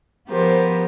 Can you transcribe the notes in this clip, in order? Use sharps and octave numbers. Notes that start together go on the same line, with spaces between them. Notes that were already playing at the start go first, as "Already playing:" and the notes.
F3 B3 G4 A#4 C5